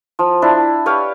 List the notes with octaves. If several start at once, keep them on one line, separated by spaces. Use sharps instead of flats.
F3
D4 E4
G4 B4 C#5 F5